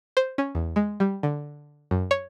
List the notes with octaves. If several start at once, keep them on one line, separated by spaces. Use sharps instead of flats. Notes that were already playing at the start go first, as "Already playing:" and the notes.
C5
C#4
E2
G#3
G3
D3
F#2
C#5